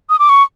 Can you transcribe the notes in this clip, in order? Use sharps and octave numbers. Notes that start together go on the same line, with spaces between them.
D#6
D6
C#6